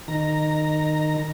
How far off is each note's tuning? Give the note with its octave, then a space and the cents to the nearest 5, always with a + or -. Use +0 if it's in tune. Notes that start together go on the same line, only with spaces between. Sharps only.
D#3 -20 A#5 +0